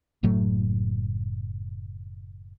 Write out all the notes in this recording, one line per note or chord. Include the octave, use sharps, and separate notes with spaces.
F#1 A2 F#3 A3